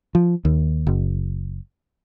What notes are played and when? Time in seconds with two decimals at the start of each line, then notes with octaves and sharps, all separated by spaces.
0.15 F3
0.45 D#2
0.87 F#1